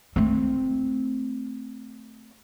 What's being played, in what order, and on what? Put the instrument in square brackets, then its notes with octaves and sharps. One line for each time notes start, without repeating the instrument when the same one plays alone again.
[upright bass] A3 C4